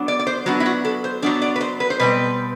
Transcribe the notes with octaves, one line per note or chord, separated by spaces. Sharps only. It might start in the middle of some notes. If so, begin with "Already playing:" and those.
Already playing: F#3 B3 D4
D5
D5
C5
F#3 B3 D4 F#4
E4
F#4
A4
C5
F#3 B3 D4 D5
D5
B4
C5
B4
C5
B2 G3 C4 B4